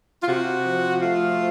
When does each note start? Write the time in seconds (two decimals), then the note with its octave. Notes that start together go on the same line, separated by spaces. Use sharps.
0.22 F4
0.27 C3 F#4
0.64 F3
1.02 A3 F4